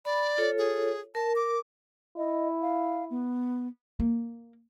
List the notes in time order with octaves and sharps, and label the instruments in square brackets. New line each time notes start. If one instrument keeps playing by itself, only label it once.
[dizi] D5 [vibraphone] B5
[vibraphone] F4 A4 C#5
[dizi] G#4
[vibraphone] A#4 [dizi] A5
[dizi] D6
[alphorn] E4 [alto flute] D#5
[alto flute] F5
B3
[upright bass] A#3